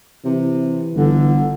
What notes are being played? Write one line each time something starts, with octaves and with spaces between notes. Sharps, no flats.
C3 E3
G1 D3